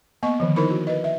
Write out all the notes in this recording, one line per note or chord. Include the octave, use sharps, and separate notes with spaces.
A#3 B3 D#5 C#6
D3 D#3 F3
D#4 E4 A#4 C5 B5
F#4
B4 D#5
E5